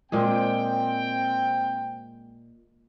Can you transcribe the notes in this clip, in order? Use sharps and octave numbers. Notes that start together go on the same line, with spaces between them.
A#2 G#3 C4 G#4 G5